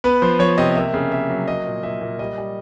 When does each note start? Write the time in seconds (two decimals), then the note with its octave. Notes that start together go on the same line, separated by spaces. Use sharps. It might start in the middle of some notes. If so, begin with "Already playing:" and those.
0.04 B3 B4
0.22 F3 C5
0.39 F3 C#5
0.58 C3 D#5
0.75 A#3 E5
0.94 C#3
1.11 A#3 E5
1.30 F#3
1.47 F#3 D#5
1.66 A#2
1.83 A#2 E5
2.01 A#2
2.19 G3 D#5
2.38 G3